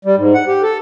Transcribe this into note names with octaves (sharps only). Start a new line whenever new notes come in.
G3
G#2
F#5
G4
A4